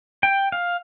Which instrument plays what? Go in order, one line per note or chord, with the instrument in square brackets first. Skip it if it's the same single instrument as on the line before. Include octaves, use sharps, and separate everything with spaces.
[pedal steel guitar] G5
F5